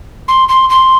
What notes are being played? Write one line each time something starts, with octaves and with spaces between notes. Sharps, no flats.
C6
C6
C6